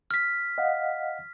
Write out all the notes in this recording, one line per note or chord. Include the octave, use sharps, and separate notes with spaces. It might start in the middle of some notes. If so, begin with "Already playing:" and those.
F6 B6
D#5 F5 F#5